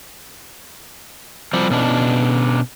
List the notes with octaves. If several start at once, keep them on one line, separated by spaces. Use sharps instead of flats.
F3 G3 C4 G4
B2 C#4 D4